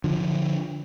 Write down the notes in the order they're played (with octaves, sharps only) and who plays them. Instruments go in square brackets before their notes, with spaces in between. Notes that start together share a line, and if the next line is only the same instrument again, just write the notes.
[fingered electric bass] D3 F3